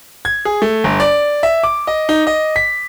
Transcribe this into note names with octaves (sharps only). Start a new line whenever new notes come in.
G#6
G#4
A3
G1
D5
E5
D6
D#5
D#4
D#5
B6